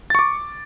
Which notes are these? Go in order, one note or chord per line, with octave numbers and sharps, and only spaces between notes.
C#6 D6 A6